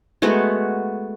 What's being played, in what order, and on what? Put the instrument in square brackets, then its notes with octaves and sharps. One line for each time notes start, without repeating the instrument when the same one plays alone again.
[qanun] G#3 A3 B3 F#4